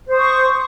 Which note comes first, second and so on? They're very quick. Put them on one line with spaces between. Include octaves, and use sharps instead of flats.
C5 D#6 C#6